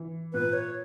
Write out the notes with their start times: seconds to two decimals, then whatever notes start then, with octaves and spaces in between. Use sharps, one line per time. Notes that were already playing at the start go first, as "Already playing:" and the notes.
Already playing: E3
0.33 A#2 B4
0.53 C#5